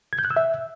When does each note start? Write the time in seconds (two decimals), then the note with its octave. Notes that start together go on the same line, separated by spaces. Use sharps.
0.13 G#6
0.19 G6
0.25 F#6
0.31 E6
0.37 E5